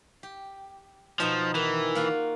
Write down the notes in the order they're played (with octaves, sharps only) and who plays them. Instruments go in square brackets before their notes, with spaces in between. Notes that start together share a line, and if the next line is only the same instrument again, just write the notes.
[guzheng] G4
[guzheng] B2 B3 D#4 [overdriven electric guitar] F3
[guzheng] D#3 [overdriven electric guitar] E3
[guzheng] A#3 F4 F#4